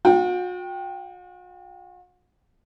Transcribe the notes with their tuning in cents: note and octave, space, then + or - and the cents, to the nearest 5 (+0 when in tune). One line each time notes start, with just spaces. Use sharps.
F#4 -45 G5 +0